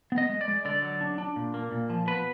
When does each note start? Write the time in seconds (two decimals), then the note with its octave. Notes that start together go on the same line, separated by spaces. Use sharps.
0.12 B3
0.18 D#5
0.29 G#3
0.41 D5
0.48 G#3
0.65 D3 D5
0.82 F#3
1.01 D4
1.18 D4
1.36 A#2
1.54 A#3
1.72 A#2
1.90 F3
2.07 B3 B4